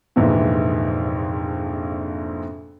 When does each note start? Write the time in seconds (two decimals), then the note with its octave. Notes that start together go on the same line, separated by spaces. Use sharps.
0.16 A#1 F2 G#2 C3 E3